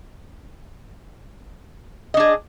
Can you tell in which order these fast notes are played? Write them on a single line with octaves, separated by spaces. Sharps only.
D#5 D4 G#4